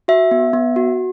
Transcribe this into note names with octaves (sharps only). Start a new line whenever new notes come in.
F#4 E5
B3
B3
F#4